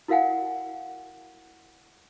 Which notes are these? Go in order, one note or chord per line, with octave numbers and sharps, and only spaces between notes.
E4 F#4 A#4 F5 F#5 G#5